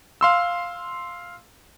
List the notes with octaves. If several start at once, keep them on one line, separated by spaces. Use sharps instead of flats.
F5 C6 E6